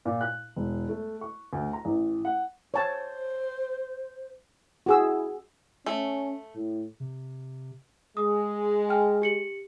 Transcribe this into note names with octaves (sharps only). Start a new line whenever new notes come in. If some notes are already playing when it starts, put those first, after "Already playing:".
A#2
F#6
E1
A3
C#6
D2
A#5
A1
F#5
C5 C#5 A5
E4 F#4 G#4 E6
A3 C#4
A2
C3
G#3 D#6
G5 G#5 F6
G4 C#7 F#7